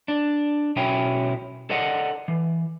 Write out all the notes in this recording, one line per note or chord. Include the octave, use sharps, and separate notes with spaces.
D4
B1 F#3 C#4 E4 G5
A4 D5 D#5 F#5
E3